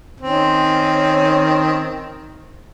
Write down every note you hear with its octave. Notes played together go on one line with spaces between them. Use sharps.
D#3 C4 C#4